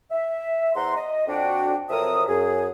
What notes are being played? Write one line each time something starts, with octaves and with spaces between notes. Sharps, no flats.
E5
E2 C5 F#5 A#5 C6
D#5
F2 D4 F#4 G5
F2 C3 F#3 A#4 E5 D#6
F#2 G#4